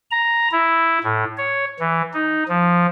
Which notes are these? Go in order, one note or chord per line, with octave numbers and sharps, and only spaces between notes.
A#5
E4
A2
C#5
E3
D#4
F3